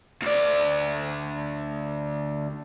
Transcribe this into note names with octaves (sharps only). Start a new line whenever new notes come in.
D2 D5